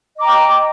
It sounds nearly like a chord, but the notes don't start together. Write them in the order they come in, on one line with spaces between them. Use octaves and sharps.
D#5 D6 A#5 G5